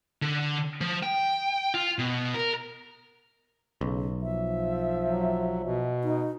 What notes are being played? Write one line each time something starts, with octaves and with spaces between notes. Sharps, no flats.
D3
F3
G5
F4
B2
A#4
B1 C#3
F3 E5
F#3
B2
D#4